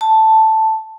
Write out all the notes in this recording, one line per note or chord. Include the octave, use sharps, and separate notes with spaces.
A5